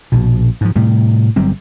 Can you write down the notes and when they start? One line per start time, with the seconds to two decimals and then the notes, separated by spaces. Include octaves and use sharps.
0.12 A#1 B2
0.61 G#2 F3
0.76 A2 C3 G3
1.36 G1 F#3 G3 C4